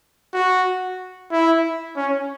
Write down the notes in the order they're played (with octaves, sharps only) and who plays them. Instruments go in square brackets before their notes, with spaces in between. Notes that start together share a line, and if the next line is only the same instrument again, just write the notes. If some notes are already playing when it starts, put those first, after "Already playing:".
[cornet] F#4
E4
C#4